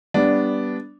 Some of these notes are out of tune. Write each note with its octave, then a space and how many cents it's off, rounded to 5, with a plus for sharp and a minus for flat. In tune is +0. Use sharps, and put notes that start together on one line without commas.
G3 +0 B3 +0 D4 -10